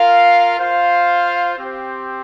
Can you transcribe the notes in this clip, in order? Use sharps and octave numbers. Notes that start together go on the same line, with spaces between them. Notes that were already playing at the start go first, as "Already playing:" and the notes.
Already playing: F4 A#4 F5
F4 C5 F5
C4 G4 C5